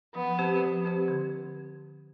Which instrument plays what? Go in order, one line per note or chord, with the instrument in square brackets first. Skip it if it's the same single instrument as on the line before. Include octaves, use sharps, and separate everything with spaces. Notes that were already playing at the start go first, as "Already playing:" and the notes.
[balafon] F3 [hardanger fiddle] B3
[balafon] C4 G4 C5
F3
C4 G4 C5
D3